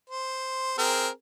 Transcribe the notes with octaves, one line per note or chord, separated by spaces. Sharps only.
C5
C4 G#4 A#4